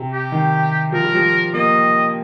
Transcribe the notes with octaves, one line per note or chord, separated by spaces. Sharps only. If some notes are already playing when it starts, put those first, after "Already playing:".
Already playing: C3
G4
D#3
F3 A#4
G3
F3
A#3 D#5